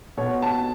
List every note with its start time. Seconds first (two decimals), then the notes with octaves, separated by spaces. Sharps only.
0.17 B2 C#5
0.42 A5